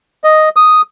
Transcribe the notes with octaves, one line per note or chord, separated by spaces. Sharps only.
D#5
D#6